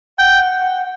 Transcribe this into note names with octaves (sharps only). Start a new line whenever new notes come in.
F#5 G5